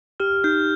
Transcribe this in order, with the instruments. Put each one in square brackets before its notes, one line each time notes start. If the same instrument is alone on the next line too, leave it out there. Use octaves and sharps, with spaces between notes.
[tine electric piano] G4 [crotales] F6
[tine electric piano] D#4 [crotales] G6